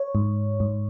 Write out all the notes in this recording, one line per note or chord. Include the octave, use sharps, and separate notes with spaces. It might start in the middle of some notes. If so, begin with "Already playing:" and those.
Already playing: C#5
G#2
G#2